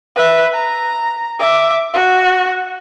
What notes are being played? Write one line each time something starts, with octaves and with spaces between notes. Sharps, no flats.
B4 E5
A#5
E5 D6
F#4